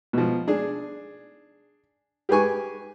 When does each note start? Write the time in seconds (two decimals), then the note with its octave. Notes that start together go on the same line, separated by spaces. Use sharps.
0.13 B2 F3
0.48 D4 G#4
2.29 G4 G#4 B4 G#5 C#6